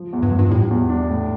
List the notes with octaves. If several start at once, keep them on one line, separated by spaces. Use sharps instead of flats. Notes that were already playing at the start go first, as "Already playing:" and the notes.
Already playing: F3
E2
G2
F3
G2
A2 G3
E2
D4
A2